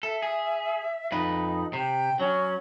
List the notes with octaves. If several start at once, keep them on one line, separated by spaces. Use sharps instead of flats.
A4 E5
G#4
F2 D#4 B4
C3 G5
F#3 C#4